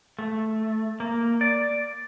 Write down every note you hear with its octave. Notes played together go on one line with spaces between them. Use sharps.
A3
A#3
D5